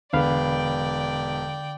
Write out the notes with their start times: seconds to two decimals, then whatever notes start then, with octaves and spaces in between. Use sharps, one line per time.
0.13 E1 D3 B3 D5 F5 G5 B5